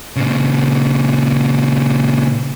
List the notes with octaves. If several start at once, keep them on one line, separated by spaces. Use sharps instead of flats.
A#2 C#3